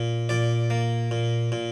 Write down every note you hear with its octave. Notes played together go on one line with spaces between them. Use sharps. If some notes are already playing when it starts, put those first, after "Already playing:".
Already playing: A#2
A#2 D5
A#3
A#2
A#2